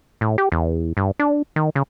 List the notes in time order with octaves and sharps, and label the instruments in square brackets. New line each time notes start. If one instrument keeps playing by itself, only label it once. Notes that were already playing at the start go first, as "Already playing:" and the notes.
[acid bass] A2
G4
E2
G2
D4
D#3
C#3